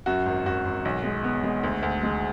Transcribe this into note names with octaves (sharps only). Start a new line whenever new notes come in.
F#2 F#4
G#1
G#1 F#4
G#1
B1
G#3
B3
G#3
D2
D2
G#3